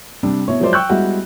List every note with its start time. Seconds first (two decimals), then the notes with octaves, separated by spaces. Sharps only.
0.23 C3 G3 D4
0.48 B2 E4 C#5
0.60 F3 F#3 G#3 E4 C5 D5
0.73 G5 C#6 E6 F#6 G6
0.89 G3 G#3 B3 E4 F#4